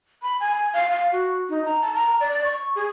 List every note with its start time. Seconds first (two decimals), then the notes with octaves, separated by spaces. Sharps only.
0.22 B5
0.40 G#5
0.74 F5
0.91 F5
1.12 F#4
1.50 D#4
1.65 A#5
1.82 A5
1.95 A#5
2.20 D5
2.44 C#6
2.76 G#4